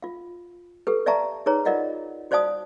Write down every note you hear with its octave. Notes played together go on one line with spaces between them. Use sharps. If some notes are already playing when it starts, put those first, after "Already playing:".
F4 F5
G4 A4 B4
D5 E5 F5 A5 A#5 C#6
D#4 G#4 B4 C#5 A#5
F4 A#4 D5 D#5 F5 F#5
F#4 C5 D5 F5 A5 D#6